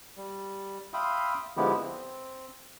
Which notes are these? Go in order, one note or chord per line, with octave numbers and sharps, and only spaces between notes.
G3
E5 F5 G5 B5 C6 D#6
D3 F3 G#3 B3 E4 G4
C4